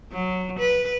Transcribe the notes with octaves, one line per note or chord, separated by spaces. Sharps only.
F#3
B4